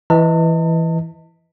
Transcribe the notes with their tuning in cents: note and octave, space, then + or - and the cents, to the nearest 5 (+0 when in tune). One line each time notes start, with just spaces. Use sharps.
E3 +0 D#5 +20 A5 +40